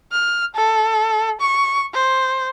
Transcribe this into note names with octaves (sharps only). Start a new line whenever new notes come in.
F6
A4
C#6
C5